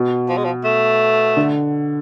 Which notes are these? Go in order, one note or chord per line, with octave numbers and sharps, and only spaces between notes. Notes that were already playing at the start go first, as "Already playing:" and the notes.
Already playing: B2
F3
G#3
F3
A3
D3